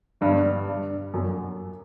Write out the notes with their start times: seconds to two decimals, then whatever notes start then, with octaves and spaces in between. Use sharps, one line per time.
0.21 G2 D3 G3 B3 D4
0.68 G2
1.14 F#2